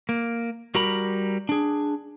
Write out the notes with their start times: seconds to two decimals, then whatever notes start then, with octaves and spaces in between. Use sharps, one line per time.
0.09 A#3
0.75 G3 F#4 A#4 A#5 B5
1.49 D4 G#4